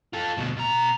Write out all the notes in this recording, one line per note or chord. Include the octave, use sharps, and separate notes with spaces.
F4 A4
D2 B2
B2 A#5